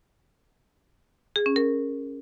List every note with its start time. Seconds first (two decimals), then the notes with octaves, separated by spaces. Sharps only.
1.36 G#4
1.46 C#4
1.56 A#4